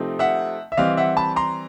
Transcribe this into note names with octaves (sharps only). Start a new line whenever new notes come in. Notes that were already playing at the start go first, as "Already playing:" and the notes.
Already playing: C3 F3 A3 C4 D#4
E5 F#5
E5
E3 G3 C4 D#5 F5
E5 F#5
A5 B5
A#5 C6